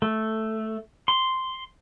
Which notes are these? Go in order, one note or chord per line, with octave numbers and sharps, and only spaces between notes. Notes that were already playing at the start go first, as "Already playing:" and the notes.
A3
C6